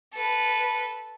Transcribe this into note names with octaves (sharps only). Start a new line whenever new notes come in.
A4 B4